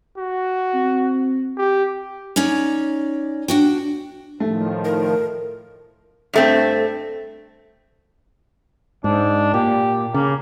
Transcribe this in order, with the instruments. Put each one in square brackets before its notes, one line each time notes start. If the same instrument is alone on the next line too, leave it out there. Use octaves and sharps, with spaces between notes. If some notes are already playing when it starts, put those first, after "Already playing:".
[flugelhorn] F#4
[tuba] C4
[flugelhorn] G4
[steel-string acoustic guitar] C#4 D#4 C#5 D5
D4 F#4 G5
[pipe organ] A2 D#3 F3 [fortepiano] A3
[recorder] A#4
[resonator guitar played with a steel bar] G2 A3 C4
[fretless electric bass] G#2 [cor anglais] D4
[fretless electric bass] A#2 [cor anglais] G4
[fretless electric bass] C#3 [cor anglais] A#3